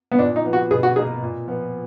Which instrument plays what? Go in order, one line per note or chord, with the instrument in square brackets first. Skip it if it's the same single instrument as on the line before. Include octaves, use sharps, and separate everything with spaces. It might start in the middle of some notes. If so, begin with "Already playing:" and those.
[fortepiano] B3
[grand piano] A#2 [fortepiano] D4
[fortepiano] D#4
[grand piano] F3 B3
[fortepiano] F#4
[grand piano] B2 [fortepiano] G#4
[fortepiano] F#4
[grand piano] A#3 D#4 [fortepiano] G#4
[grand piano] A#2
F3 B3